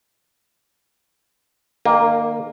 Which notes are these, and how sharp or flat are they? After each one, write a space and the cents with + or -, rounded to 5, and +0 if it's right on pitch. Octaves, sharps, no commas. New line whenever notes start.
D#3 -35 A#3 +0 G#5 -45